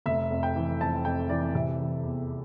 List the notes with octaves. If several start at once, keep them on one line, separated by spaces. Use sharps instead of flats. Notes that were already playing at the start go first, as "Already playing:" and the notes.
F1 E5
F2
G5
E3
F2 A5
F2 G5
E3 D5
C3 E5
E3
E2